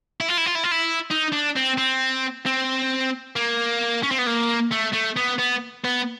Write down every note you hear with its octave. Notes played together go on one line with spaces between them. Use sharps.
E4
F4
E4
F4
E4
F4
E4
D#4
D4
C4
C4
C4
A#3
C#4
C4
B3
A#3
A3
A3
B3
B3
B3